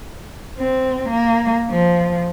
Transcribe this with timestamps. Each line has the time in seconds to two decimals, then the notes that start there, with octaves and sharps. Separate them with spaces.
0.58 C4
1.09 A#3
1.70 F3